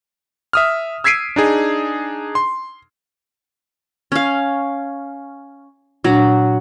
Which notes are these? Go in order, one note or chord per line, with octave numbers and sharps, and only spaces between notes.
E5 D#6 F6
E6 G#6 B6 C7 D7 D#7
D4 D#4 G#4
C6
C#4 F5
A#2 F#3 D4 F#4